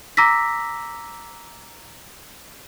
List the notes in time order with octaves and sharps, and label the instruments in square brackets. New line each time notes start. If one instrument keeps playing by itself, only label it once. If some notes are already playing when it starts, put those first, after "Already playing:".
[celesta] A#5 D6 E6 A#6 B6